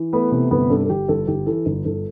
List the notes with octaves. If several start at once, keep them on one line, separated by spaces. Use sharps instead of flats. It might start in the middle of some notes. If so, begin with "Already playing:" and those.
Already playing: E3
A3 B3 B4
C3 B3 B4
G1 B3 B4
G2 A4
A4
G1 G4
G1 A4
G1 G4
E3 A4
G1
G1 A4